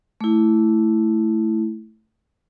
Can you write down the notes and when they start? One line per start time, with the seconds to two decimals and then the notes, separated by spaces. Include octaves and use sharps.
0.21 A3 E4